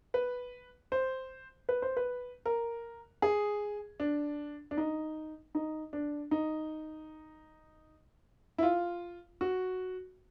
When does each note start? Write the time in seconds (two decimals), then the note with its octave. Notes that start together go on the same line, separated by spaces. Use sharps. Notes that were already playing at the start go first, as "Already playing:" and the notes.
0.14 B4
0.92 C5
1.69 B4
1.82 C5
1.97 B4
2.46 A#4
3.22 G#4
4.00 D4
4.71 D4
4.77 D#4
5.55 D#4
5.93 D4
6.31 D#4
8.58 E4
8.63 F4
9.41 F#4